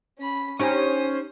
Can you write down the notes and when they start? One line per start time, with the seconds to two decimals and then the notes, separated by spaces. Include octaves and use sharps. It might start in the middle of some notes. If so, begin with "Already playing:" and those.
0.19 C#4 B5
0.59 C#4 D#4 G4 C5 D#6